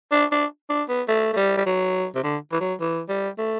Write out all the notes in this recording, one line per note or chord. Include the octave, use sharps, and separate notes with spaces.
D4
D4
D4
B3
A3
A3
G3
G3
F#3
C3
D3
E3
F#3
E3
G3
A3